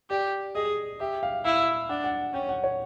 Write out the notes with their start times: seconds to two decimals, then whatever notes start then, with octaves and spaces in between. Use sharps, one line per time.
0.10 G4 D5
0.55 G#4 D#5
1.00 G4 E5
1.23 F5
1.45 E4 F5
1.89 D4 F#5
2.04 F#5
2.34 C#4 G5
2.49 F#5
2.64 C#5